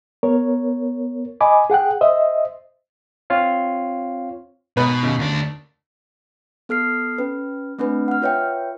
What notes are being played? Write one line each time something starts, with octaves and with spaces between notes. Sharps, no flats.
B3 A#4 C#5
D#5 G#5 B5 D6
G#4 F#5 G5 F#6
C5 D#5 E5
C4 F4 C#5 F5
G#2 B2 B3 B4
D#2 C#3
D2 D4
B3 A4 F6 C7
C#4 B4
A3 C4 D4 B4
F#5 F6
F4 B4 C#5 E5 G5